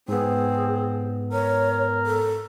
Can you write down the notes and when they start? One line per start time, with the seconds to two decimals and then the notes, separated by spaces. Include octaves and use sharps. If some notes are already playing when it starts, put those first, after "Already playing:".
0.08 G#2 B3 C4 G#4
1.32 A#4 C#5
2.06 A4